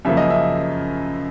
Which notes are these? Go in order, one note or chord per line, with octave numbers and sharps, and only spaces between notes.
F#2 C#3 F3 A#3 E5
D#5
E5